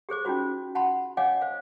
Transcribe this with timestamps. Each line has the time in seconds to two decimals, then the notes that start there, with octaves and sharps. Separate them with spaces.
0.09 G4 G#4 C5 D6
0.25 C#4 D#4 F4 F#4 C5
0.75 F#5 A5 B5 C6
1.17 C#5 D#5 F5 F#5 G#5 D6
1.41 C5 F5